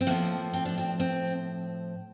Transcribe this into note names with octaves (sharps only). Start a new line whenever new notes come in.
C4
A2 F3 A#3
C4
D4
C4
C4